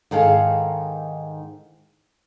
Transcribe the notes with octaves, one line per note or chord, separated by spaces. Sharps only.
G#2 D#3 G#4 A4 F5